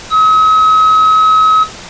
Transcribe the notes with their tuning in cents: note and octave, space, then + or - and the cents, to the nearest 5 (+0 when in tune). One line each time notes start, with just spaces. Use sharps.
D#6 +45